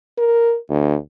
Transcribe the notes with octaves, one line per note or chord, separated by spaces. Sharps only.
A#4
D2